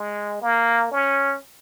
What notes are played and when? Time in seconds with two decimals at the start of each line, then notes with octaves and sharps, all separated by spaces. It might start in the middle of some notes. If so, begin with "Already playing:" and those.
Already playing: G#3
0.42 A#3
0.91 C#4